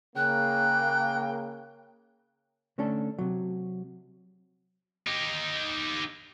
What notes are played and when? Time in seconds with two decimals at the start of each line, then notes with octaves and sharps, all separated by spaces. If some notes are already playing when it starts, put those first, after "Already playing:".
0.16 C#3 A#3 G5 F#6
2.78 D3 A3 C#4 D4 A4
3.19 C3 F#3
5.07 D#4 G4